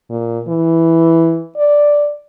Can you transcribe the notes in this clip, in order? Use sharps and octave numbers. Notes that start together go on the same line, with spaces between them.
A#2
E3
D5